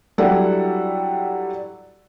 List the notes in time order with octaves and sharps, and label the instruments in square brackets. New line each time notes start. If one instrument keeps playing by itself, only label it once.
[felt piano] F#3 G3 D4 E4 A4 F#5